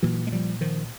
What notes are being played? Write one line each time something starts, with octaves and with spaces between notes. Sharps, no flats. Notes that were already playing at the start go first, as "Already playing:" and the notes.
A#2 E3 F#3
G#3
F3 G3
D#3 F3